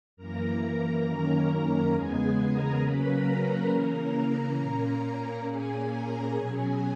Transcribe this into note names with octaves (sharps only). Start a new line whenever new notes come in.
F#2 E3 A#3 A#4 A#5
F#2 D#3 A#3 C#4
E2 C#3 G#3 B3 G#4 G#5
G#4 G#5
A#4 A#5
C#3 F#3 A#3 C#4 B4 B5
A#4 A#5
B4 B5
C#3 E3 A#3 C#4 A#4 A#5
A#2 A#3 C#4
A#2 A#3 C#4 G#4 G#5
A#4 A#5
B2 F#3 C#4 G#4 G#5